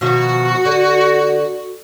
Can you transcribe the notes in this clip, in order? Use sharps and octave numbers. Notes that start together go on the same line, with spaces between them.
B2 D#3 F3 F#4
D3